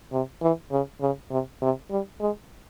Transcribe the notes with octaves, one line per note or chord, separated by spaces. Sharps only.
C3
E3
C#3
C#3
C3
C3
G3
G#3